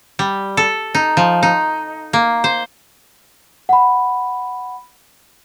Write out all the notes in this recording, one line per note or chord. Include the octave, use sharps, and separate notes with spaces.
G3
A4
D#4
F3
D#4
A#3
C5
F#5 B5